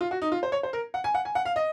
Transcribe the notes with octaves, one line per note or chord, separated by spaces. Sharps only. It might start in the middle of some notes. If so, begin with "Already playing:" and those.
F4
F#4
D#4
F4
C5
C#5
C5
A#4
F#5
G#5
F#5
G#5
F#5
F5
D#5